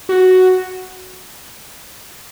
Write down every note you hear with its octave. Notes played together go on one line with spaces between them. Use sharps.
F#4